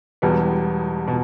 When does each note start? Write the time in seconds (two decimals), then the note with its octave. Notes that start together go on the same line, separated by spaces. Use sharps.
0.22 E1 E2 B2 G3 B3
1.08 B2